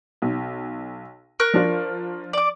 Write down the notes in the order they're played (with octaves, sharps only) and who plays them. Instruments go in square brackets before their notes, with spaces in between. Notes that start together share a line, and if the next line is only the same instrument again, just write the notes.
[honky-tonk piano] B1
[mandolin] A#4 C#6 F#6
[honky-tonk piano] F3 D4 F4
[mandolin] D5 D6